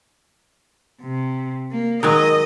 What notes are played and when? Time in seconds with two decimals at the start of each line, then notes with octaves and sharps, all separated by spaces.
1.02 C3
1.71 A#3
2.03 D#3 F#3 G#3 D#5